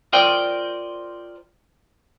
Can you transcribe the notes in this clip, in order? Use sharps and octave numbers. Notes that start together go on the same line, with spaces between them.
F4 A#4 C5 D5 D#5 G5